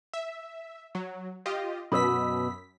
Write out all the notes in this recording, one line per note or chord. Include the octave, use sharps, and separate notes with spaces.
E5
F#3
F4 G4 D#5
F#2 B2 B5 D#6 E6 B6